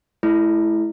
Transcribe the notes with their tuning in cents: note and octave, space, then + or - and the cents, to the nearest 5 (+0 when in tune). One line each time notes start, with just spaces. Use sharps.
A3 -35 E4 +0